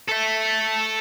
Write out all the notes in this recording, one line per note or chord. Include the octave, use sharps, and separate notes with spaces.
A4 E5